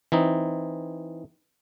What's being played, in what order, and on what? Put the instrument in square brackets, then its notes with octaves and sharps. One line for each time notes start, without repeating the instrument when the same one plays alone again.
[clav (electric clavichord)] E3 C4 D#4